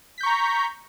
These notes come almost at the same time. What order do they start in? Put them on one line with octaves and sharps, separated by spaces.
B6 G6 C#6 A#5